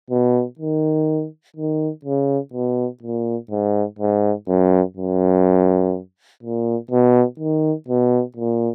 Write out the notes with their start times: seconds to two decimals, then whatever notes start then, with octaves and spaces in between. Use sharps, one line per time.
0.10 B2
0.59 D#3
1.56 D#3
2.05 C#3
2.53 B2
3.03 A#2
3.50 G#2
3.99 G#2
4.48 F#2
4.97 F#2
6.43 A#2
6.91 B2
7.40 D#3
7.88 B2
8.37 A#2